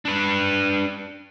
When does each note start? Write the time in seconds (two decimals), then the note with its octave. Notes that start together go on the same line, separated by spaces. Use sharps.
0.05 D4 B4